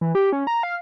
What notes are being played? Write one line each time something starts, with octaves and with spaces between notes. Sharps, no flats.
E3
G4
C#4
A#5
F5